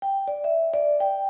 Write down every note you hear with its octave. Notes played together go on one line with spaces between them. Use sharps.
G5
D5
E5
D5
G5